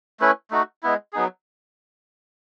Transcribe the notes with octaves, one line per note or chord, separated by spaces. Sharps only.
A3 C#4 E4 B4
A3 D#4 F#4
G#3 B3 E4
F#3 B3 D#4 G#4